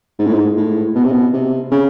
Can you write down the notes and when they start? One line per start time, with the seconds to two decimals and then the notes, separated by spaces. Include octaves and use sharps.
0.19 G#2
0.27 A2
0.33 G#2
0.57 A2
0.95 B2
1.04 C3
1.12 B2
1.33 C3
1.71 C#3